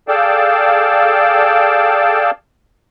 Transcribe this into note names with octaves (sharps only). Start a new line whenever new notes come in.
G#4 A4 D5 F5 G5 A5